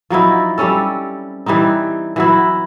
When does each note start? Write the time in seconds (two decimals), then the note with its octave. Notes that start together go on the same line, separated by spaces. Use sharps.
0.10 F3 F#3 D#4 E4
0.58 G3 C4 C#4 A4
1.46 E3 G3 C4 D#4
2.16 E3 F#3 E4